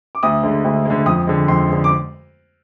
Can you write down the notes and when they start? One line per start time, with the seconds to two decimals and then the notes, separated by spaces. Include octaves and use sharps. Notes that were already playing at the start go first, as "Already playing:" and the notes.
0.15 D6
0.23 D2 D#6
0.43 D3 G#3
0.64 D2
0.85 D3 G#3
1.06 F2 D#6
1.27 D3 G#3
1.48 F2 C6
1.69 D3 G#3
1.84 D6